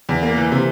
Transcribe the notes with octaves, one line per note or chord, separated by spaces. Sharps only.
E2
A#3
E3
C3